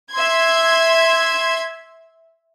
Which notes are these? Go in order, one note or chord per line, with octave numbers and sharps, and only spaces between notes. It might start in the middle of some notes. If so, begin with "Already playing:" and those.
E5 C6 G#6